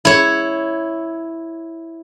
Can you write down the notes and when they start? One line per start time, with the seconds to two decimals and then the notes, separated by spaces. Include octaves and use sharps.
0.05 E4 C#5